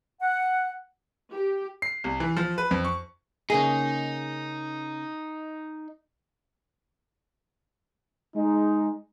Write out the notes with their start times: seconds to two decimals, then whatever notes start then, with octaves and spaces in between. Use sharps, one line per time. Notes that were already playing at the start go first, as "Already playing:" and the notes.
0.22 F#5
1.32 G4
1.82 C7
2.04 C2
2.20 E3
2.37 F3
2.58 B4
2.71 F2
2.85 C#6
3.50 C#3 A#3 D#4 G#4
8.36 G#3 D#4